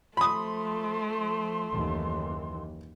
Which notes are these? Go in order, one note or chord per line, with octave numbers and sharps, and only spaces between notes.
F3 A3 B5 C6 D#6
F#1 D#2 E3